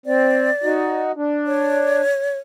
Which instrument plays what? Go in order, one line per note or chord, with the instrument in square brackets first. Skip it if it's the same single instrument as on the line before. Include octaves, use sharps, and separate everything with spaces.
[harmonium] C4 [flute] D5
[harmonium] D#4 F#4
D4
[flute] C#5